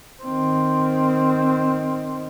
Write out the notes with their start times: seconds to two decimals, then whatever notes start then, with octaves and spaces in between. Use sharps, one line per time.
0.22 D#3 C4